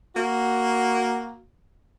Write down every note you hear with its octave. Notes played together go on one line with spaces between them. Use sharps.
A#3 F#4